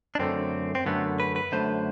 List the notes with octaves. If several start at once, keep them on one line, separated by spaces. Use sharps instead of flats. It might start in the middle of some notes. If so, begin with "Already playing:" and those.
D4
F#2 D3 A3 C4
C4
F#2 D3 A3 B3
B4
B4
F#2 D3 A3 C5